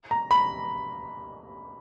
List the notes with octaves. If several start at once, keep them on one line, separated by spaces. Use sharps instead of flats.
A#5
B5